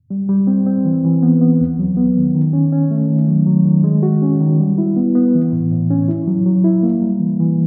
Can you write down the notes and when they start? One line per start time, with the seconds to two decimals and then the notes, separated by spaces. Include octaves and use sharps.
0.11 G3
0.29 G3
0.47 C4
0.66 C4
0.85 E3
1.04 E3
1.23 B3
1.41 B3
1.61 D#2
1.79 F#3
1.97 B3
2.17 D#3
2.35 D#3
2.53 C#4
2.72 C#4
2.91 A3
3.09 D#3
3.29 F#3
3.46 F#3
3.65 D#3
3.84 G#3
4.03 F#4
4.22 C#4
4.40 D#3
4.60 G3
4.78 E4
4.96 B3
5.15 B3
5.34 E3
5.52 A2
5.72 A2
5.91 C#4
6.08 E4
6.27 F#3
6.45 F#3
6.64 E4
6.83 A#3
7.02 G3
7.20 E3
7.40 E3